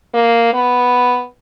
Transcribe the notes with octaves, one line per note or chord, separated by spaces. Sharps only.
A#3
B3